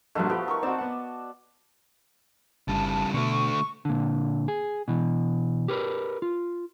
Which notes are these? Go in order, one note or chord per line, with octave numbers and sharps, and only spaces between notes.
A#1 G2 A3 F4 F#4
F3 B3 G4
D#4 A#4 C#6
C4 F#4 D5 A5 E6
B3 F#5
G1 C#3 G3 A5
B2 D3 A3 C#6
A#2 D3
G#4
B2 E3
G4 A#4 B4
F4